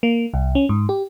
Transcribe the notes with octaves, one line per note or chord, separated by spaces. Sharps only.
A#3
C2
C#4
G#2
G4